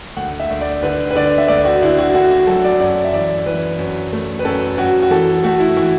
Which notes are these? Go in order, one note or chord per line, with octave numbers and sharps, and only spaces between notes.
D2 F#5
E5
D2
D5
D3 B4
B4
D3 D5
E5
D2 D5
F#4
D3 E4
F#4
D3 F#4
F#4
F#3 A4
D5
F#2 D5
E5
E3 D5
E3 B4
F#2
A3
B4
F#2 A4
F#2 F#4
F#4
E3 A4
A3 F#4
E4
E3 F#4